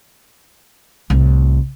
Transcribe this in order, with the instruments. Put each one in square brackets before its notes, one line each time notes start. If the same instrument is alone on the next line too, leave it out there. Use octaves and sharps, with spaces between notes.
[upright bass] C2 A2